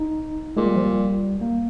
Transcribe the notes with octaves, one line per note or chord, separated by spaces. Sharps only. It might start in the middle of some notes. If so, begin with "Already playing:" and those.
Already playing: D#4
A#2 G#3
G3
F3
G3
A#3